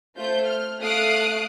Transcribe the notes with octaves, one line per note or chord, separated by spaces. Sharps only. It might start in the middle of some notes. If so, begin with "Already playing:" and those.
A3 F4 C5 G6
F6
A3 F5 D#6 F#6 C7 D7